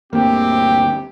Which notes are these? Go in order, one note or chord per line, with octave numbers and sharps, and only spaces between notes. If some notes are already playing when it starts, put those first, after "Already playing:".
G1 D2 A#3 C4 G4